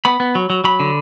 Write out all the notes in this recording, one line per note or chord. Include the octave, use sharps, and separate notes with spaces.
B3 B5
B3
F#3
F#3
F#3 B5
D3